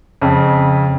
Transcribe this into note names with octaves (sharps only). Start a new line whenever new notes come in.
F2 C#3